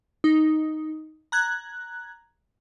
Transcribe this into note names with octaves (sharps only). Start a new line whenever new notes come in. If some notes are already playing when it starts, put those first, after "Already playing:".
D#4
A#5 F#6 G#6